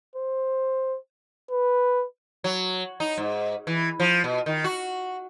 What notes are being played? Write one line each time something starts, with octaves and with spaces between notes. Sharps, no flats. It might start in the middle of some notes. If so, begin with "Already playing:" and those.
C5
B4
F#3
D#4
G#2
E3
F3
B2
D#3
F#4